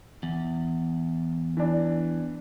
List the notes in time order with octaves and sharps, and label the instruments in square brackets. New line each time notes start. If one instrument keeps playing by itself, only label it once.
[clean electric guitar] E2
[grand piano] E3 D4